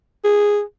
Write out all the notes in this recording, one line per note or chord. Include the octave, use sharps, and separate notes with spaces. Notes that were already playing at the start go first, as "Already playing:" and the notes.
G#4